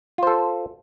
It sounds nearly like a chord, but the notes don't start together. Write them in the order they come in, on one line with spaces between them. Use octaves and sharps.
F4 C5 A4